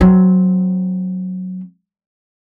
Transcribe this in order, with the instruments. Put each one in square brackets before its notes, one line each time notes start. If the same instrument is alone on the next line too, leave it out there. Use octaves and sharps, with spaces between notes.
[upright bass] F#3 C4